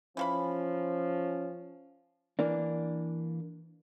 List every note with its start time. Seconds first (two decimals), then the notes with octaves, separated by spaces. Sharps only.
0.17 E3 F3 C#4 F5 B5
2.39 E3 A#3 D4